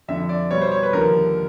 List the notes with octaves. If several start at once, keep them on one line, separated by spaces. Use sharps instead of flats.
F2 D3 F3 E5
D5
B2 G3 B3 C#5
C5
C#5
B4
D#2 D3 F3 A#4